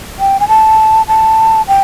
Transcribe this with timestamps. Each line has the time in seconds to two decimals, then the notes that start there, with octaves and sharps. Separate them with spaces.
0.19 G5
0.40 G#5
0.48 A5
1.08 A5
1.68 G5